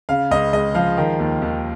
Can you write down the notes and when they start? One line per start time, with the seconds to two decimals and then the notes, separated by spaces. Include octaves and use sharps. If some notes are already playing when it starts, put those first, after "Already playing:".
0.09 C#3 F5
0.31 C#2 D#5
0.53 G#3 D#5
0.75 F3 F5
0.97 D#3
1.20 D#2
1.42 D#2